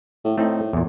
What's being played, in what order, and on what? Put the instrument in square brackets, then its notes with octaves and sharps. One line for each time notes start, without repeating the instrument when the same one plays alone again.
[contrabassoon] A2
[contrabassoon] A2 [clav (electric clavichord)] A3 C4 D#4
[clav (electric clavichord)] E2 A#2